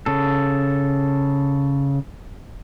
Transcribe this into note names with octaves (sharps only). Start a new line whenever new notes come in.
C#3 A4